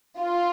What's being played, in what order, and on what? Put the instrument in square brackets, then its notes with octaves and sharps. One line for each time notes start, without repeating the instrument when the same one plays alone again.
[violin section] F4